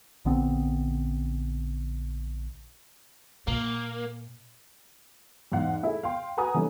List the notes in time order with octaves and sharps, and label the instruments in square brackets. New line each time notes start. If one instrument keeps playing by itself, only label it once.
[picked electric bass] A#1 D3 B3 C4
[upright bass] A#2 [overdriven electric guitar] A#3
[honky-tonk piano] E2 G#2 F5 F#5
A3 E4 G#4
F5 G5 C6
F#4 B4 F#5 G#5 A#5 D#6
D#3 E3 G3 A3 A#3 C#4